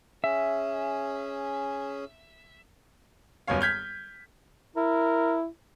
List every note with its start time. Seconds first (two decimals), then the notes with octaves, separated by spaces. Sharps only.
0.24 C#4 G#4 E5
3.47 D#1 F#2 B3 C#5 F5
3.61 F6 G6 G#6 B6
4.76 E4 A#4